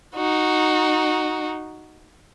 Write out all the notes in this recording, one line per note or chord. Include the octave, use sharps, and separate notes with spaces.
D#4 F#4